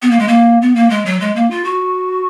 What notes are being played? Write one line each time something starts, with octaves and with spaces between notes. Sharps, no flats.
B3
A#3
G#3
A#3
B3
A#3
G#3
F#3
G#3
A#3
F4
F#4